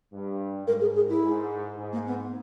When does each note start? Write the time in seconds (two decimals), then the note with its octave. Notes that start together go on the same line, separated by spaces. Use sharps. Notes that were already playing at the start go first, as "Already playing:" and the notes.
0.12 G2
0.67 G#2 A#4
0.81 G#4
0.95 G#4
1.09 E4
1.22 G#2
1.78 G#2
1.93 A#3
2.07 B3